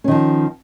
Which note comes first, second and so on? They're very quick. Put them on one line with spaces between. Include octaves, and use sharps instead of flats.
C#4 D#3 F3